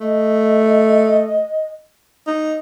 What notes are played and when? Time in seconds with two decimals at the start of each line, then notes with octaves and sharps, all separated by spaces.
0.01 A3 D#5
2.27 D#4